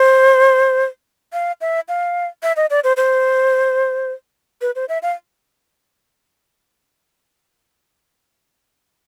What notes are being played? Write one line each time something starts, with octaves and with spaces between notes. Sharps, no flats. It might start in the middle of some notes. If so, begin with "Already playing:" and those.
Already playing: C5
F5
E5
F5
E5
D#5
D5
C5
C5
B4
C5
E5
F5